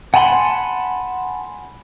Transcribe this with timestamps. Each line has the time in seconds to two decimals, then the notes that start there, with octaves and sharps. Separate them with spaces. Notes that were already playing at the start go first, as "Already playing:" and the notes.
0.14 F#5 G#5 A5 B5 C6